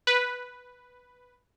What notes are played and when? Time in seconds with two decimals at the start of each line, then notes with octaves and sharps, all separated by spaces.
0.07 B4